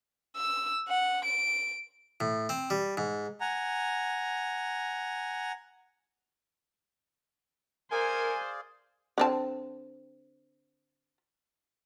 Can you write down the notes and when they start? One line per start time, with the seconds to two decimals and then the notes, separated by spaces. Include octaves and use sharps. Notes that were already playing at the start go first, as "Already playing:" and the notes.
0.36 E6
0.89 F#5
1.25 D7
2.20 A2
2.49 C4
2.70 G3
2.97 G#2
3.41 F#5 G#5 A#5
7.92 G#4 A#4 C5 D5 F5 G#5
9.18 D3 C4 A5